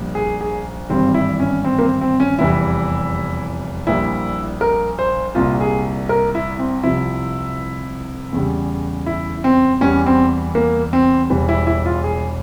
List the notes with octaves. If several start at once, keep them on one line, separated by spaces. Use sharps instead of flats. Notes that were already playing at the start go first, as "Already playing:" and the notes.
Already playing: A#1 A#2 G3
G#4
G#4
G#1 G2 E3 G3 C4
E4
C#4
C4
A#3
C4
C4
C#4
F1 E2 E3 G3 E4
A#1 A#2 G3 E4
A#4
C5
C2 A#2 G3 F4
G#4
A#4
E4
C4
C2 C3 F3 E4
E2 C#3 G3
E4
C4
E2 E3 G3 C#4
C4
A#3
C4
E1 E2 E3 G3
E4
E4
F4
G#4